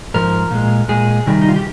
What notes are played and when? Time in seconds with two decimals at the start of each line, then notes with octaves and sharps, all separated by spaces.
0.14 G#2 F3 A#4
0.51 A#2 G#3
0.88 A#2 G#3 G#4
1.27 C3 D#3 G3
1.41 D#4
1.48 F4
1.56 G4